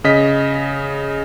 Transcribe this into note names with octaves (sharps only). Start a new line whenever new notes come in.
C#3 D#5 B6